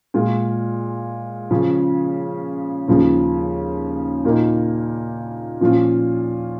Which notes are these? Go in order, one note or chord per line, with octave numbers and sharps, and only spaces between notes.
A#2 G#3 F4
C#3 F3 C#4
D#2 C#3 F3 C#4
A#2 A#3 D#4
A#2 F3 C#4 F4